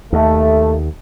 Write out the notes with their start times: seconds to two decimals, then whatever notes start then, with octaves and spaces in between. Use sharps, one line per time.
0.13 D#2 A3